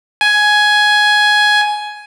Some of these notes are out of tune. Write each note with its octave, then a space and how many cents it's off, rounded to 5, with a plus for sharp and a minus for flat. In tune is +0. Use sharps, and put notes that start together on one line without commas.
G#5 +10